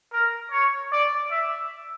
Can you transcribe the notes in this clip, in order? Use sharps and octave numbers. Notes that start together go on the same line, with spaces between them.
A#4
C#5
D5
E5